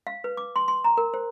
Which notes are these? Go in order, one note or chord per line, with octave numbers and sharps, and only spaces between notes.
F5
B4
D6
C6
C6
A#5
A#4
C5